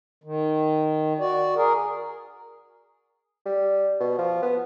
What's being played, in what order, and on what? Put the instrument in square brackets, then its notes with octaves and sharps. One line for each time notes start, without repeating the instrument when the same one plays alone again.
[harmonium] D#3
F#4 D5
G#4 A#4
[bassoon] G3
B2
F3
B3